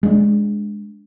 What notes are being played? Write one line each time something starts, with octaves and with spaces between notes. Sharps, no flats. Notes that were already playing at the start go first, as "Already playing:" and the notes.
G#3 D4